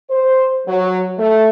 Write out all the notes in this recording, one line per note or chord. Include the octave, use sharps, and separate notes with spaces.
C5
F#3
A3